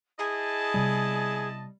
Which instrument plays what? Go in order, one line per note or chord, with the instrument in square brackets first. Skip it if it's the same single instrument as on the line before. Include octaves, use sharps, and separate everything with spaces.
[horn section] E4 D#5 A5 [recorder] G#4
[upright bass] C3 B3 [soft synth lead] G3